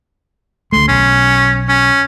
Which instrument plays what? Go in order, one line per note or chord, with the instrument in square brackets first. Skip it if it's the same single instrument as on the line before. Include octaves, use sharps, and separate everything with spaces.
[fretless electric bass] D2 A3 [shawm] C6
[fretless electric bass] B1 [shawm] C#4
[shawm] C#4